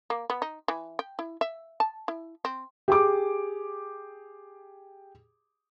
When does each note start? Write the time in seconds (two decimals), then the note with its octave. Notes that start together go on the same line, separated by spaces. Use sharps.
0.10 A#3
0.30 B3
0.42 D#4
0.68 E3
0.99 G5
1.19 E4
1.41 E5
1.80 A5
2.08 E4
2.45 C4
2.88 G4 G#4 D6